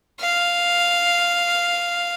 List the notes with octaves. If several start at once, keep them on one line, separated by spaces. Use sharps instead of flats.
F5